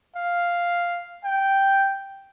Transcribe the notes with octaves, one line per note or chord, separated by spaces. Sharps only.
F5
G5